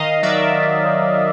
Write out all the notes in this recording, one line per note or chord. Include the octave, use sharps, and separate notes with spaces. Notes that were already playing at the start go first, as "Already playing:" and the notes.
Already playing: D#3 D#5 F5
F#3 D5 E5
F#3
D#3